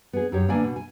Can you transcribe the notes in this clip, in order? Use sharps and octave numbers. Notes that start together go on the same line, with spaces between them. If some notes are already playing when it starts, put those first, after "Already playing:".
B3 G#4
F#2 G4 C#5
D3 A#3 B3 D4 D5 G#5
B2
G#5